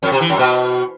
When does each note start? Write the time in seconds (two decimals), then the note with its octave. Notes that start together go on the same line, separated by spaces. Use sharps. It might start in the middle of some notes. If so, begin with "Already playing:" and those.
0.03 F2
0.12 C3
0.21 E3
0.30 F#2
0.39 B2